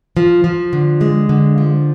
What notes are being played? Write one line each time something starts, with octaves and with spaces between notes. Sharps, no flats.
F3
F3
D3
G#3
D3
F3